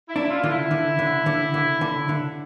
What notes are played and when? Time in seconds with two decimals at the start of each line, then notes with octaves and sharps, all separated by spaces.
0.09 E4
0.16 D4
0.30 F4
0.43 D3 F4
0.51 E4
0.71 D3
0.99 D3
1.26 D3
1.54 D3
1.81 D3
2.09 D3